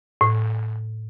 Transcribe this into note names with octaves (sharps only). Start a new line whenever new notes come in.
A2